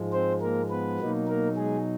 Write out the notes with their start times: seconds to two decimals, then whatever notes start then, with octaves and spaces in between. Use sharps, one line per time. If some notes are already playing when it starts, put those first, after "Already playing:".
Already playing: G#2 F3 G#3
0.12 C4 C5
0.41 A#3 A#4
0.70 B3 B4
0.99 B2 F#3 A#3 D#4
1.28 A#3 A#4
1.56 G#3 G#4